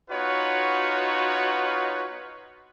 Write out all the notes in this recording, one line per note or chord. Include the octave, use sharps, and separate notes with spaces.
B3 D#4 F4 F#4 B4 C#5